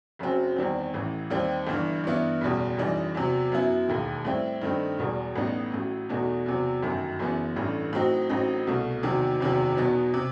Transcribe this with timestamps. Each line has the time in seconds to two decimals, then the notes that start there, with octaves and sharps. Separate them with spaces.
0.19 F#1 F#2 F#3 C4 F#4
0.56 E2 D#3 G3 C4
0.94 A1 A2 E3
1.30 D#2 D#3 G3 C4
1.67 G1 G2 E3
2.04 G2 E3 B3 E4
2.41 F#1 E2 B2 G3
2.77 F#1 F#2 E3 G3 D#4
3.15 E2 C3 F#3
3.52 F#2 F#3 B3 E4
3.88 E1 D#2 D#3
4.25 A2 G3 C4 E4
4.62 G2 D#3 A3 C4 D#4
4.99 E1 E2 B2 G3
5.35 A1 A2 G3 B3 D#4
5.72 A1 A2 F#3
6.09 E2 B2 A3 D#4 F#4
6.46 E2 C3 F#3
6.83 G1 F#2 D#3 F#3
7.19 F#1 F#2 E3 B3
7.56 A1 G2 E3 A3
7.93 A2 F#3 C4 D#4 F#4
8.29 A1 A2 F#3 C4 D#4
8.67 C2 B2 A3
9.03 E2 C3 D#3 F#3
9.40 F#1 E2 C3 D#3 F#3
9.77 E2 B2 F#3 B3 D#4
10.14 C3